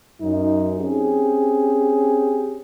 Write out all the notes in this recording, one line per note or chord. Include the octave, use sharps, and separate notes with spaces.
F#2 D#4
C4 C#4 G4 G#4